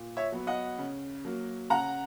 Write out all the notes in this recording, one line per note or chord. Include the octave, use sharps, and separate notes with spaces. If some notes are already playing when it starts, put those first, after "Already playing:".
Already playing: A#2
C#5 E5
F#3 B3
D#5 F#5
C#3
F#3 A#3
C#3 F#5 A#5